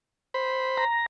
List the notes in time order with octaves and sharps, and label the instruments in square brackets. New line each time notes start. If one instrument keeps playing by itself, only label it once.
[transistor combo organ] C5 B5
[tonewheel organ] A#5